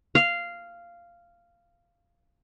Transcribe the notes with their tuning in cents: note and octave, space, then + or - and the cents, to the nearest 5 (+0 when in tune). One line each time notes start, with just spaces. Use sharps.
F5 -10